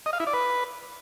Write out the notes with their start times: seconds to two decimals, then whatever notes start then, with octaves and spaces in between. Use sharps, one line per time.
0.06 D#5
0.13 F5
0.20 E4
0.27 D5
0.34 B4